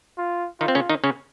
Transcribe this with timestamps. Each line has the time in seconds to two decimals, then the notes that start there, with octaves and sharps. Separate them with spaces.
0.18 F4
0.61 D#3 D#4 F4
0.68 C4
0.75 C#3 C#4
0.89 D#3 D#4
1.04 C#3 C#4